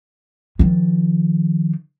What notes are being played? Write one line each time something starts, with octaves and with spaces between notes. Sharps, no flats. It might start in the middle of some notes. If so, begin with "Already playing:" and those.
D#3 F3